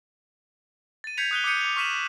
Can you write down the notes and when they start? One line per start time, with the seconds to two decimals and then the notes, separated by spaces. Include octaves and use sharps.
1.04 A6 D#7
1.17 G6 G#6 B6 C#7 F7
1.31 D#6 F#6 D#7 G7
1.44 D6 D#6 G6 C#7 D#7
1.61 D6 F7
1.76 C#6 F6 B6 D#7 E7 F#7